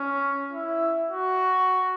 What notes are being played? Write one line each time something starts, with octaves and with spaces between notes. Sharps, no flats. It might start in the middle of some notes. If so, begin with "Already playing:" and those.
Already playing: C#4
E4
F#4